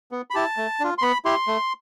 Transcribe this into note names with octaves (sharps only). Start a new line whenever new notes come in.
B3
B5
E4 G4 A5
A3
D4 F4
C6
B3 B5
E4 G4 C6
A3